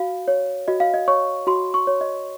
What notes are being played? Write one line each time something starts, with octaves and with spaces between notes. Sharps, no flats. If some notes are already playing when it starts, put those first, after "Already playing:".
Already playing: F#4 F5
C#5
F#4 D#5
F5
D#5
C#5 C#6
F#4 C6
C#6
C#5
D#5